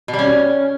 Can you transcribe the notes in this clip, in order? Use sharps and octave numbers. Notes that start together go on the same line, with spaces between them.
B2
G3
C#4